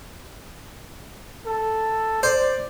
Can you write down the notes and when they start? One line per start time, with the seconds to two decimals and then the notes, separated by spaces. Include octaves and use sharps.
1.46 A4
2.23 C5 D5